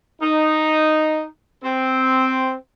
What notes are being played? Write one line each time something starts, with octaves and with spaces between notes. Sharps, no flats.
D#4
C4